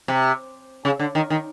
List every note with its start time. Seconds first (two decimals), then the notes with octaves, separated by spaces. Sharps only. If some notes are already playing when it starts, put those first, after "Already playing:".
0.08 C3
0.85 C#3
0.99 D3
1.15 D#3
1.30 D#3